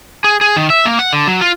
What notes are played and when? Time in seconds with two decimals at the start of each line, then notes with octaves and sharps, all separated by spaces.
0.24 G#4
0.41 G#4
0.56 D#3
0.70 E5
0.85 A#3
0.99 F#5
1.13 D3
1.27 F#3
1.41 F4